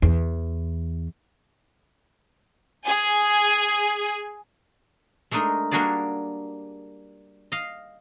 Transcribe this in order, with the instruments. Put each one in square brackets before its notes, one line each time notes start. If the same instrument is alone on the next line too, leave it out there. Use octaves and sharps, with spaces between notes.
[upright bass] E2
[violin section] G#4 G#5
[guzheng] G#3 A3 D4 D#4 A#4 D#5
G3 A#3 D4 F#4 G#4 D5
D#5 F5